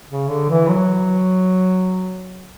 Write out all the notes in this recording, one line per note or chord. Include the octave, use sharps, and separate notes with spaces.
C#3
D3
E3
F#3